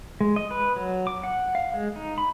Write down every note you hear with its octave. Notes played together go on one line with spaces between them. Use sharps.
G#3
D#5
B4
F#3
D6
F#5
F5
G#3
D#4
B5